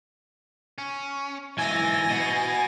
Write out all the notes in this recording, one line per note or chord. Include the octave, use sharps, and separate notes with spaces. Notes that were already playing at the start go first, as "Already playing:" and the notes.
C#4
B1 G#2 E3 E5 G#5 A6 A#6
B2 D#5 F#5